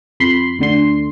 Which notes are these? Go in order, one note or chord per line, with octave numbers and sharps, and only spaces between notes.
F2 B5 C6
D2 D3 C6